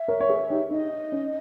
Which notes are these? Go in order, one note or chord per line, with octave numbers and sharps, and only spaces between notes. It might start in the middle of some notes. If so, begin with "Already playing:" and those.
Already playing: E5
A#4 C#5
C#5
G#4 B4
D#4 G4
D#4 D#5
C#4